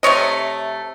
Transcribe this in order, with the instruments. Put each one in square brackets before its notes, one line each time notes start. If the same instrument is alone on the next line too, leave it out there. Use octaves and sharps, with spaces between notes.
[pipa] C3 A3 C#5 D#5